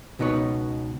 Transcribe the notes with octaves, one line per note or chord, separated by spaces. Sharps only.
C#2 B2 D#4 B4 C#5